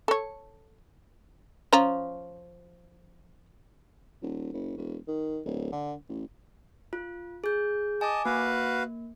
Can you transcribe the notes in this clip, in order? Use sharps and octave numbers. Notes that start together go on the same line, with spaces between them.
A4 C#5
F3 C#4 A#5
D#1
F#1
E1
D#3
D1
D3
A1
F4
G#4 G6
D#5 G#5 A5 D6
A#3 F#4 B4 F5